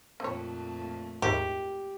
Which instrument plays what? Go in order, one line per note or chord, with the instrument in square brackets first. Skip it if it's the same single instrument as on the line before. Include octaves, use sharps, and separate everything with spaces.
[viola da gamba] F2 A#2 A3 [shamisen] C4 C#5
[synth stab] D#2 G#2 [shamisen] E4 A#4 C#5 [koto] G4